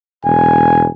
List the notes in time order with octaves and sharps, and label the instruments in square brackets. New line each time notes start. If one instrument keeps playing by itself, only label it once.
[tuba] E1 [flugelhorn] G#5